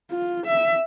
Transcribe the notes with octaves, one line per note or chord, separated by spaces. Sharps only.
F4
E5